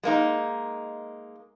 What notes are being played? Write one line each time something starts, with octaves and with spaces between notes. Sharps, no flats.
G#3 A#3 D#4